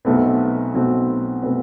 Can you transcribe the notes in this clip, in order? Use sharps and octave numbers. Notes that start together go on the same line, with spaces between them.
B1 B2 A3 C4 B4
B1 B2 A3 C4
B2 A3 C4 B4